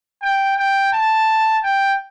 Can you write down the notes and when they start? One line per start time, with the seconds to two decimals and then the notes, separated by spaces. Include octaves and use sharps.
0.22 G5
0.57 G5
0.93 A5
1.63 G5